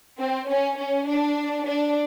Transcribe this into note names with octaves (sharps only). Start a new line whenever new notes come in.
C4
C#4
C#4
D4
D4